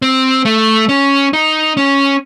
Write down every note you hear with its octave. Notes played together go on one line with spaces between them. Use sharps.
C4
A3
C#4
D#4
C#4